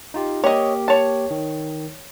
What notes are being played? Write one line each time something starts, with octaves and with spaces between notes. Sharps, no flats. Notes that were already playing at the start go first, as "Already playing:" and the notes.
D#4 F4 G4
A#3 G4 C#5 D#5
C#5 A5
D#3